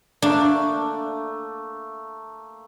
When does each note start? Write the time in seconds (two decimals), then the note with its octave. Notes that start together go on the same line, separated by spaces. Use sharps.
0.22 A3 A#3 D4